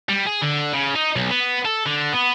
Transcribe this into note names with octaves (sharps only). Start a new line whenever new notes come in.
G3
G#4
D3
C#3
D#4
B1
B3
A4
D3
B3